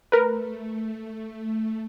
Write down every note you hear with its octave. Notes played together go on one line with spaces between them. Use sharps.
A3 A#4 B4